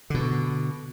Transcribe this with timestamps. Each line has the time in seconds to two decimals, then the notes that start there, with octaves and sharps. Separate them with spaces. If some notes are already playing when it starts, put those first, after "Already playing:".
0.10 B2 D3